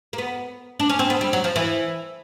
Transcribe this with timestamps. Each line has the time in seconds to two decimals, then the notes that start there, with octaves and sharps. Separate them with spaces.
0.13 A#3
0.18 B3
0.80 D4
0.90 C#4
0.99 C4
1.10 B3
1.21 G3
1.33 F#3
1.44 F3
1.56 E3